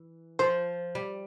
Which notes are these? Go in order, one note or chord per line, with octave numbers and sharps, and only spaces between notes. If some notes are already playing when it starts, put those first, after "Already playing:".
Already playing: E3
F3 C5
G3